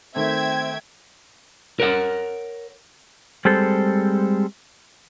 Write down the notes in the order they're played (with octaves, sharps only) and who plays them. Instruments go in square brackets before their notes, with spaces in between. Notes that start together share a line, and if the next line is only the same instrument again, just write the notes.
[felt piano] D#3 A3 [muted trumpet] C4 [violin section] E5 G5 G#6
[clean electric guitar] A#4 C#5 F#5
[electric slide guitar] G3 G#3 C4 A4 C5